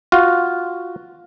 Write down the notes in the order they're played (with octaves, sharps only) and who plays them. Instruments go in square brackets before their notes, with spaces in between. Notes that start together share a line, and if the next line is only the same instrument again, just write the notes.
[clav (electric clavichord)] F4 F#4